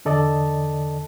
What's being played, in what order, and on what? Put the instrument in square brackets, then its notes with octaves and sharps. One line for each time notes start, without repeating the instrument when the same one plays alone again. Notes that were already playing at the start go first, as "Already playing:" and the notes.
[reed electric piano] E2 D3 A4 D5 D#5 A5